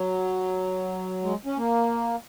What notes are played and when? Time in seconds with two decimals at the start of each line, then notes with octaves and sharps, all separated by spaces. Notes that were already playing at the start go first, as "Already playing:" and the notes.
Already playing: F#3
1.23 G#3
1.45 C#4
1.57 A#3